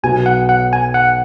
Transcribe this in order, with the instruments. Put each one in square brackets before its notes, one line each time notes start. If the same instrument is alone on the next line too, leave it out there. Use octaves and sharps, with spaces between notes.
[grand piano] B1 B2 B3 [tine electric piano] G#5
[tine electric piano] F#5
F#5
G#5
F#5